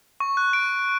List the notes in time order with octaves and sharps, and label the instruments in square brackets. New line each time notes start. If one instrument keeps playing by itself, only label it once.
[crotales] C#6
F#6
D7